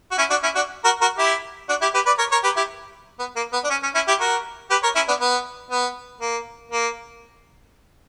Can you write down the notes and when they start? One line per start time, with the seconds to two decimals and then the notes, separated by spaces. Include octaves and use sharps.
0.11 F#4
0.18 C#4 E4
0.30 D4 F#4
0.43 C#4 E4
0.55 D4 F#4
0.84 F#4 A#4
1.01 F#4 A#4
1.18 E4 G4
1.69 D4 F#4
1.81 E4 G4
1.94 G4 B4
2.06 B4 D5
2.18 A#4 C#5
2.32 A#4 C#5
2.44 G4 B4
2.56 E4 G4
3.19 B3
3.36 A#3
3.53 B3
3.64 D4
3.70 C#4
3.83 C#4
3.94 C#4 E4
4.08 E4 G4
4.20 F#4 A#4
4.70 G4 B4
4.83 A#4 C#5
4.95 C#4 E4
5.08 B3 D4
5.21 B3
5.71 B3
6.21 A#3
6.72 A#3